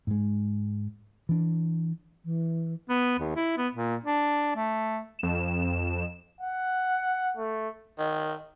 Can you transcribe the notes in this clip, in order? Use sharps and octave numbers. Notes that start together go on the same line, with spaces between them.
G#2 G#3
E3 D4
E3
B3
D#2
E4
B3
A#2
D4
A3
F2 E7
F#5
A3
D#3